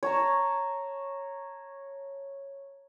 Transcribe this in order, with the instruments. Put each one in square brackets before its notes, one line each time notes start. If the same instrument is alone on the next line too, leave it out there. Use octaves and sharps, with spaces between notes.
[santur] C#5 A5 A#5